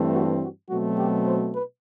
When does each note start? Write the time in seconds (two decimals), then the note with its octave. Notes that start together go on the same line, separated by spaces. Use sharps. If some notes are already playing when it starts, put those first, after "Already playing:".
Already playing: G2 E3 A3 C4
0.13 F#4
0.41 F#4
0.69 B2 F#3 A3 C4 F#4
0.97 G4
1.26 C5
1.53 B4